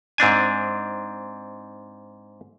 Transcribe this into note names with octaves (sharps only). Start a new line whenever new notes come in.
G#2 C4 D4 G#5